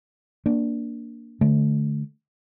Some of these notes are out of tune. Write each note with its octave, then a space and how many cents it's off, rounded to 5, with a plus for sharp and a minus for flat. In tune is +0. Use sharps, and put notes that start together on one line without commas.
A#3 +0 D4 +0
D3 +0 A3 -25